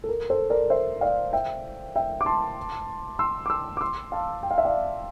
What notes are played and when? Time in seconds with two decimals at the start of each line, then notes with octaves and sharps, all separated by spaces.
0.04 A4
0.09 A#4
0.30 A4 C5
0.50 A#4 D5
0.70 C5 E5
1.01 D5 F5
1.33 E5 G5
1.96 E5 G5
2.21 D6
2.26 A5 C6
3.19 C6 E6
3.46 D6
3.50 C6 E6
3.77 D6
3.81 C6 E6
4.12 F5 A5
4.43 G5
4.51 F5
4.58 E5
4.65 D5 F5